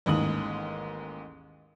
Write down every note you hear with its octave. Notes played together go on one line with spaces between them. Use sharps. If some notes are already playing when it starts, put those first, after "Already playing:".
A1 D#2 G#2 D#6 F#7